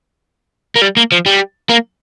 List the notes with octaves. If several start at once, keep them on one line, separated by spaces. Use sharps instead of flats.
A#3
G3
A#3
F3
G3
A#3